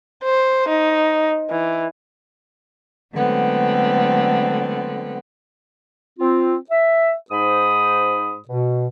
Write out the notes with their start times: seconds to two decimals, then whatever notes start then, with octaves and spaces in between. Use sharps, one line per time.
0.23 C5
0.68 D#4
1.50 E3
3.13 D3 F#3 G#3 A3 B3 C4
6.19 C4 F4
6.70 E5
7.31 G#2 D#4 C5 B5 D#6
8.49 B2